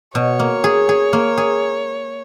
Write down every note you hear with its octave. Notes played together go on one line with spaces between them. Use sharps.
B2 C#5
A#3
G#4
G#4
A#3
G#4